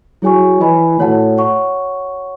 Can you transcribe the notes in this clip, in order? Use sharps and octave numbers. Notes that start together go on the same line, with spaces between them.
F#3 E4 G#4 C#5 G#5 C#6
E3 E4 B4 D#5 G#5 B5
A2 F#4 C#5 F#5 A5
C#5 F#5 C#6